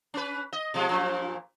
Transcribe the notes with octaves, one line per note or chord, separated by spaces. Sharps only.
C#4 B4
D#5
B2 F3 G#3
F#2 A#2 F3